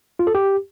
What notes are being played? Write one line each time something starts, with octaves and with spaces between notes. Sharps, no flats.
F4
A4
G4